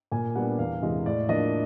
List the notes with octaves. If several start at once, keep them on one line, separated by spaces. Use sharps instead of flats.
A#2 G#5
G3 B3 D4 F#5
E2 F5
C3 E3 G#3 D#5
A2 D5
F3 A#3 D4 D#5